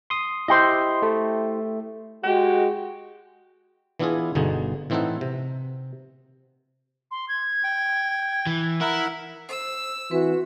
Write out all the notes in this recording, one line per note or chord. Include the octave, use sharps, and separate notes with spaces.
C6 D#6
E4 G4 C5 D#5 C6
A3
G#3 F#4 G4
E3 B3 D4 E4 F4 G#4
G1 B2 D3 D#4 G#4
A2 E3 C4 D#4 A4 F#5
C3
C6
G#6
G5
E3
E4 A#4 E5 F#5
C5 E6
E3 C4 F#4 B4